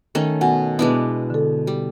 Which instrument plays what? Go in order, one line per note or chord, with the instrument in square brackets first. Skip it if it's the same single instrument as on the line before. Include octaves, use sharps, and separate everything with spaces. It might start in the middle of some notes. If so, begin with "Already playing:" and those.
[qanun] D#3 A3 C#4
[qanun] B2 [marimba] F#5 G#5
[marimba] B2 B3 B4 [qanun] G#3 D4 E4
[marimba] D3 A4
[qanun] G3